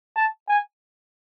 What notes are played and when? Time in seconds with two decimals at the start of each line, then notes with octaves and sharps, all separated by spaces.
0.16 A5
0.49 G#5